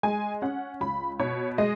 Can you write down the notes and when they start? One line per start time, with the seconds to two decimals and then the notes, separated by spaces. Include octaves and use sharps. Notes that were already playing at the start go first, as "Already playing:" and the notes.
0.03 G#3 G#5
0.42 C#4 F#5
0.81 C#2 B5
1.20 B2 C#5
1.58 G#3 D#5